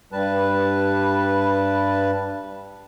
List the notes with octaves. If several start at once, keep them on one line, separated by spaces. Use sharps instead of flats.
G2 G3 B4 A5